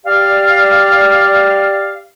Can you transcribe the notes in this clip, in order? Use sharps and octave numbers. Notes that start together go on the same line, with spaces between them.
G4 D5 F5